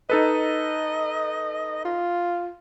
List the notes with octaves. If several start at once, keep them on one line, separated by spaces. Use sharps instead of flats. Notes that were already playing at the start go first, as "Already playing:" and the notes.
D#4 A4 B4 D#5
F4